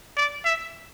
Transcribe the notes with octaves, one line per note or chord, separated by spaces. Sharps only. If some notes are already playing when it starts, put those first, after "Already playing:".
D5
E5